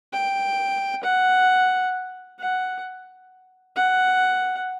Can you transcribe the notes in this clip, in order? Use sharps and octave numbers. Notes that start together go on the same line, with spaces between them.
G5
F#5
F#5
F#5